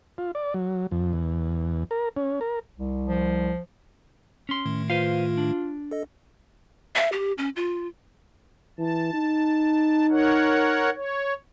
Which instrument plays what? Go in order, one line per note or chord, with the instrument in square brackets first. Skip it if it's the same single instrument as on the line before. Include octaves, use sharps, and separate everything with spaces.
[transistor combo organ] F4
D5
F#3
F2
E2
A#4
C#4
A#4
[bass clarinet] C2
[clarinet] F3
[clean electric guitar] C#4 C6
[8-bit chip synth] A2 D#3 A3
[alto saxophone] F4 [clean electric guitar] B4 C5 F5
[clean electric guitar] D4
[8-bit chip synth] A4 D#5
[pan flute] E5
G4
C#4
F4
[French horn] E3 [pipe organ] A5
[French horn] D#4
[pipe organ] A#4 C#5 F#5
C#5